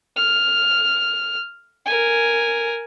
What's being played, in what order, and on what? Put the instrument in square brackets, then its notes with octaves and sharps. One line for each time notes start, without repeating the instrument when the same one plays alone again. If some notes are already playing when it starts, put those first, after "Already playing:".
[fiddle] F6
A#4 G#5